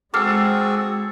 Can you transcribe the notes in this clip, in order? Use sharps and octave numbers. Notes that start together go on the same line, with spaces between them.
G#3 C4 F#4 G#4 A4 D6 F6 C7